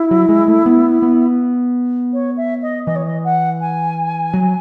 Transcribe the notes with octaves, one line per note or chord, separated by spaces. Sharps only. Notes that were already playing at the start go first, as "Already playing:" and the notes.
Already playing: E4
F#3
G#3
A3
B3
B3
C#5
E5
D#5
E3 D#5
C#5
D#5
F#5
G#5
F#3